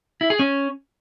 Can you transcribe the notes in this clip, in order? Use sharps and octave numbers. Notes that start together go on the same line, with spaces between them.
E4
G#4
C#4